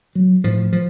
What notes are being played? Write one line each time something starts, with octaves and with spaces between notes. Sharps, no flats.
F#3
A2 F3
F3